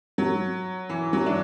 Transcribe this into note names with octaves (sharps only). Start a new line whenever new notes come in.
F#3
E3
F#3
D4